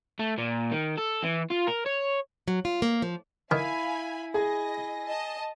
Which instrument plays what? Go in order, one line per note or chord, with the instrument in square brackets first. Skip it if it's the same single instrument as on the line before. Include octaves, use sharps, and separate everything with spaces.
[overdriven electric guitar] A3
A#2
D#3
A4
E3
F4
A#4
C#5
[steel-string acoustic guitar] F#3
F4
A#3
F3
[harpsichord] D#3 [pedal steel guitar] E4 [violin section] F5 G#5 B5
[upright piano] G#4 G#5 [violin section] D#5 A#6
[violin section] D#5 A5